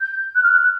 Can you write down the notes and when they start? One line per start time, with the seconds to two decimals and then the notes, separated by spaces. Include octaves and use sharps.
0.01 G6
0.35 F#6
0.43 F6
0.52 F#6